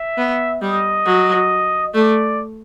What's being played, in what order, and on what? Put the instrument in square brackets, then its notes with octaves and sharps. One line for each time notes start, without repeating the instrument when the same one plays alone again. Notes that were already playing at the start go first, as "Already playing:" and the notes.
Already playing: [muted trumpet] E5
[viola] B3
[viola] G3 [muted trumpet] D#5
[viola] F#3
[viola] A3 [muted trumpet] D5